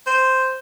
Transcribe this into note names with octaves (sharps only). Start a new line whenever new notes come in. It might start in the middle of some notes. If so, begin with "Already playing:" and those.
C5